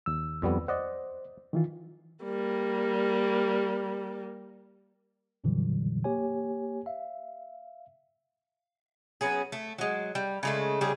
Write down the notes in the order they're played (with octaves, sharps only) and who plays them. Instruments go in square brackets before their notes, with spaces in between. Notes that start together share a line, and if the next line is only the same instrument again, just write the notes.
[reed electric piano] D#2 E6
[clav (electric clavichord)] F2 G3 B3
[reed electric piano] C5 [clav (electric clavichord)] D5 D#5 F#5
[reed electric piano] D#3 E3 F4
[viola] G3 A#3
[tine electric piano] F2 A#2 D3 E3 F#3 G3
A#3 G4 C#5 G#5
E5 F5
[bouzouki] F#3 B3 C#4 G#4
A3
F#3 G#3
G3
C#3 G#3 A3
C#3 G3 D4 G#4